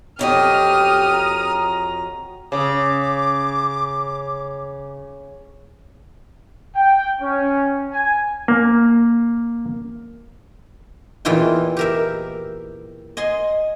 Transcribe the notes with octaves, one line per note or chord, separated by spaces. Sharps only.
F2 F#3 G4 D#5 D#6 F6
A#5
C#3 D6
G5
C#4
G#5
A#3
E2 A#2 E3 E4 F4 G5
G4 A#4 E5
D#5 G#5 C6